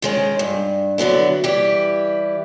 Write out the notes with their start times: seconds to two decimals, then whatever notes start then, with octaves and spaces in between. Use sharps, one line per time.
0.02 D#3 G#3 C#4
0.39 G2
0.98 D3 F#3 B3 E4
1.44 E3 G3 E4 G4